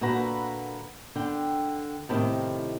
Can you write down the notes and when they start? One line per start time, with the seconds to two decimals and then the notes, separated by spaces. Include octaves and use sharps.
0.01 A#2 D3 F#4 B4 A#5
1.16 D3 G5
2.09 A2 C3 D#3